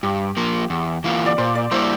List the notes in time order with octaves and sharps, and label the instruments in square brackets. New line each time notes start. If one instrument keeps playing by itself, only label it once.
[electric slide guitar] G2 [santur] G4
[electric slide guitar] F3 A#3
E2
E3 A#3 F4
[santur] D5
[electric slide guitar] A#2 [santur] C5
[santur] D5
[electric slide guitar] G3 A#3 E4 [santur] C5